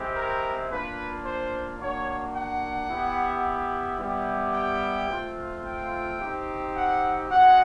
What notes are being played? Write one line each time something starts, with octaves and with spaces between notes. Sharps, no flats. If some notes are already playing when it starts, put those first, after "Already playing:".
Already playing: G#3 C4 E4 G4
A#4
A#3 D4 F4 B4
C5
A#3 D4 F#4 C#5
F#5
B3 E4 G4
G3 B3 E4 G4
G5
A3 C4 F4
G5
C4 D#4 G4
F#5
G#3 C#4 F#4 F#5